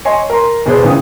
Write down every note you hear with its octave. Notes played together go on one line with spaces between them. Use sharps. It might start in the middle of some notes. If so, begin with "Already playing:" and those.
C#5 D#5 G#5 C6
A#4 A#5 C6
E2 B2 G#4 B4 C5
A#1 C#3 E3 G5 D#6